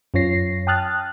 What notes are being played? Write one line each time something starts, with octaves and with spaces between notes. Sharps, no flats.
F#2 C#4 F4 C#5 A#6 C7
G5 A5 D#6 F6 F#6 A6